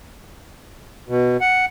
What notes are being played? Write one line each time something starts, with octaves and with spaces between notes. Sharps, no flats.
B2
F#5